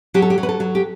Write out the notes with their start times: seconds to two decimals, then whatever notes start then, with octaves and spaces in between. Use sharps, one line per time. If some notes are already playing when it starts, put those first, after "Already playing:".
0.14 F#3 G4
0.22 A4
0.30 G4
0.38 F#3
0.43 B4
0.49 A4
0.60 F#3
0.75 G4